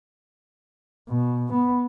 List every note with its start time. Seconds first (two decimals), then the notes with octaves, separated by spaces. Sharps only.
1.09 B2
1.53 B3